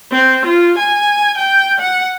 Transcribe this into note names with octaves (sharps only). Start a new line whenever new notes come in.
C4
F4
G#5
G5
F#5